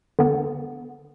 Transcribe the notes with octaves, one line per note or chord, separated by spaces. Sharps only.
D3 B3